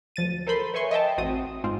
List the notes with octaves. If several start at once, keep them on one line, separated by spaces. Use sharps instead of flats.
D2 F3 A6 D#7
A4 A#4 C5 B5 C6
B4 C#5 E5 G#5 C6 C#6
D#5 E5 G5 A5
A1 C4 F#4 D#6
G#2 C4 F4